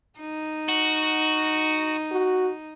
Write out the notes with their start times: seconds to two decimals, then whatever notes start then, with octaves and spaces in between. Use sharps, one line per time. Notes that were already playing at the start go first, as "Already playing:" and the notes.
0.20 D#4
0.69 F#4
2.12 F#4